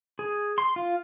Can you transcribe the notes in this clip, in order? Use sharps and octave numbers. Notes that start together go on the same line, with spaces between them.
G#4
C6
F4